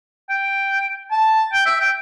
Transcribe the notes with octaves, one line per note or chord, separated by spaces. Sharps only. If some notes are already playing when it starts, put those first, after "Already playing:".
G5
A5
G5
E5
G5